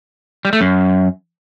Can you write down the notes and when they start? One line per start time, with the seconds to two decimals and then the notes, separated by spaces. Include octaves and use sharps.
0.45 G3
0.53 A3
0.61 F#2